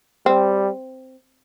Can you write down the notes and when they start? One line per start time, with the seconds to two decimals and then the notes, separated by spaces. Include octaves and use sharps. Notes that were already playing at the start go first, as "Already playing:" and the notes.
0.26 G3 C4